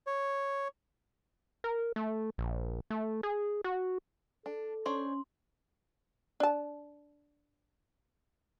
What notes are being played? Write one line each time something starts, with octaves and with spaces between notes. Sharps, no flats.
C#5
A#4
A3
A#1
A3
G#4
F#4
D4 A4
C#4 D4 C5 C#5 C6
D4 A5